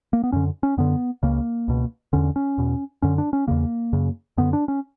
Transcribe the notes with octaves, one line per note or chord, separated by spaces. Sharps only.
A#3
B3
F#2 D3 C#4
C#4
F#2 D3 B3
C#2 C#3 A#3
C#2 B2
E2 D3 C#4
C#4
E2 B2
F#2 D3 C#4
D4
C#4
E2 C#3 A#3
F#2 C#3
F#2 D3 B3
D4
C#4